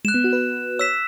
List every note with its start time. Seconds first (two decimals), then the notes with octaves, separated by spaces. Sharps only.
0.05 G#3 F#6 E7
0.14 B3
0.24 F#4
0.33 B4
0.79 C#5 E6 B6 E7